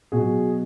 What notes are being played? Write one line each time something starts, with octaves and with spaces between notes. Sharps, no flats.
B2 F#3 F#4 G#4